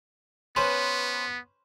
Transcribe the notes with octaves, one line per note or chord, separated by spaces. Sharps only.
B3 C#4 B4 C5